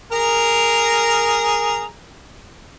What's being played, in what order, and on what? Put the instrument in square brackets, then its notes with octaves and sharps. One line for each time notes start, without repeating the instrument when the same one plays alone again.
[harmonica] G#4 A#4 A#5